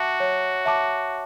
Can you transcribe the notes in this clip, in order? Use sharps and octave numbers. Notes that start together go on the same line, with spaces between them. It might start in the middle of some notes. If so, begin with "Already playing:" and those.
Already playing: F#4 E5 A5 D6
C#5
E5 A5 D6